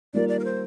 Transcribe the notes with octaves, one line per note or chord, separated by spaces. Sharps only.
D#3 G3 A#3 F4 A#4 D5
D5
A#4
C5